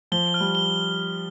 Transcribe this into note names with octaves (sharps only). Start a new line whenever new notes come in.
F3 G7
F6
G3
G7